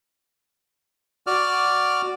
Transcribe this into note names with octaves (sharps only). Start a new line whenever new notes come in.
F#4 D5 D6 F6